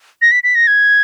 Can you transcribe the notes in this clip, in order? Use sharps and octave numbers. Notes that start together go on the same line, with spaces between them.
A#6
B6
B6
A#6
G#6